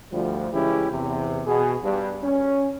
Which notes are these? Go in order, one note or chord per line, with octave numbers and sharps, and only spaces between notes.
D2 F3 G3
C#3 E3 G#3 C#4 E4 G4
E2 C3
B2 G#4
G2
C#4